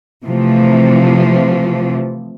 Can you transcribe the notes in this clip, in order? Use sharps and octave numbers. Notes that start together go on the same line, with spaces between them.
C3 E3 F3 A3